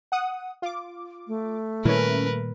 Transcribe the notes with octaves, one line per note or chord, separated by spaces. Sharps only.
F#5 D#6
F4 D6
A3
A#2 D#3 G3 C#4 E4 A#4 B4